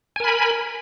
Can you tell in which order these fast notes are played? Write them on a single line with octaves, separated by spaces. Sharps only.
G#5 A#4 B5